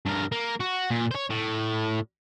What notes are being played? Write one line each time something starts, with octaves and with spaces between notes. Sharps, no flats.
G2 A#4
A#3
F#4
A#2
C5 C#5
A2